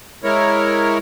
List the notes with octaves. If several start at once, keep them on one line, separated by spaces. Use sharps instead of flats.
G#3 E4 A#4 C#5